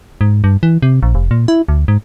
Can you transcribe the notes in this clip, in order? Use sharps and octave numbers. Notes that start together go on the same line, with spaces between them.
G#2
G2
E3
C3
A#1
F1
A#2
E4
D2
G#2